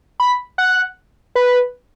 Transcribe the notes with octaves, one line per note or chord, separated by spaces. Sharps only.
B5
F#5
B4